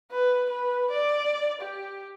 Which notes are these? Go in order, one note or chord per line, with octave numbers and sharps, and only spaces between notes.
B4
B4
D5
G4